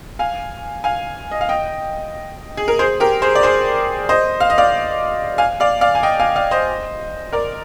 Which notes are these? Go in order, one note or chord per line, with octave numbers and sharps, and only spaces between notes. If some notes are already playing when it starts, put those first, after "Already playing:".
F5 G#5
F5 G#5
D#5
F5
D#5 G5
G#4
A#4
G#4 C5
G4 A#4
G#4 C5
D5
G#4 C5
C5 D#5
F5
D#5
D5 F5
F5 G#5
D5 F5
D5 F5
G#5
D#5 G5
F5 G#5
D5 F5
C5 D#5
A#4 D5